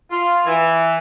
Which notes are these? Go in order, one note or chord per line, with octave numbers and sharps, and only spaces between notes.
F4
E3